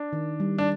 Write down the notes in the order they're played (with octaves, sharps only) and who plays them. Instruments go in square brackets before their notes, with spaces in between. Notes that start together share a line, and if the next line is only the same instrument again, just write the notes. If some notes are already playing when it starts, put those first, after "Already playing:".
Already playing: [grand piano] D4
[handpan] D#3
G3
[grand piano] D4